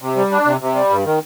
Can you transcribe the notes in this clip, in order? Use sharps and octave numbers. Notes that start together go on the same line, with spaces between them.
C3
G3
D4
C3
C3
G3
G2
D#3